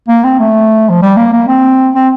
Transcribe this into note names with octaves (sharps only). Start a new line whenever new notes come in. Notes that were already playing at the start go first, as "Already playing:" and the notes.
A#3
C4
A3
F3
G3
A#3
A#3
C4
C4